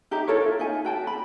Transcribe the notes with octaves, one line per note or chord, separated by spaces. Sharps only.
D#4 G4 E5 A#5
E4 A4 A#4 C#5
F4
D#4 E5 G#5
F#4 G5 A5
B5